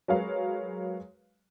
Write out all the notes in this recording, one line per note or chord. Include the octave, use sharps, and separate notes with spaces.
F#3 G#3 A#4 B4 C#5 F5